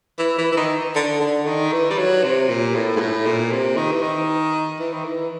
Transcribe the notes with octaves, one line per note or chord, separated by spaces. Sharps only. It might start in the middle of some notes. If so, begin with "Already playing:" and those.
E3
E3
E3
D#3
D3
D3
D#3
E3
G3
F#3
C3
A#2
A2
G#2
A2
A#2
C3
D#3
E3
D#3
E3
D#3
E3